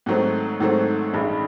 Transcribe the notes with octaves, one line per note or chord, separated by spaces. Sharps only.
G#2 D#3 F#3 A3 C4
G#2 D#3 F#3 A3 C4
A1 G2 D#3 G#3